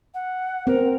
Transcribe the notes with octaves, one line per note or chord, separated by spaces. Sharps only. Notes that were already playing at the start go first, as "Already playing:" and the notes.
F#5
C4 A#4